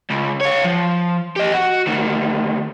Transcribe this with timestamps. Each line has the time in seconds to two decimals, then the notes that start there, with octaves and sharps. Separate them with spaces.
0.10 C#2
0.41 F4 C#5
0.64 F3
1.36 G4 D#5
1.54 F#4
1.87 D2 D#3